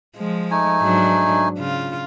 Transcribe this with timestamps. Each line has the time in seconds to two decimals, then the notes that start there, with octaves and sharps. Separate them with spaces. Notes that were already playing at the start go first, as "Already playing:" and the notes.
0.17 F3 G#3
0.51 A3 D#4 G#5
0.81 G#2 F#3 D4
1.58 C#3 F4